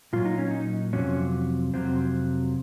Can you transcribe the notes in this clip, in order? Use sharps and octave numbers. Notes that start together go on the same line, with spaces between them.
A#2 F#3 F4
D#4
C#4
D#4
F2 C3 F#3 C#4
F2 C3 F#3 C4